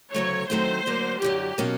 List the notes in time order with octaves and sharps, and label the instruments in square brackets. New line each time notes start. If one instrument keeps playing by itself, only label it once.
[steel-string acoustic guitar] D2 C#3 F#3 A3 [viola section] C#5
[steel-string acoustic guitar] D#3 F#3 A3 C4 [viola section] C5
[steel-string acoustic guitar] D3 F#3 A#3
[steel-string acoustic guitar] F#2 D3 F#3 [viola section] G4
[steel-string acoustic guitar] B2 F#3 A#3 C#4